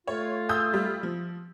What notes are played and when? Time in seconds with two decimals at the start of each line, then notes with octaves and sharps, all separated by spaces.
0.07 A3 F4 C#5
0.49 D#6 E6 G6
0.73 G3
1.03 F3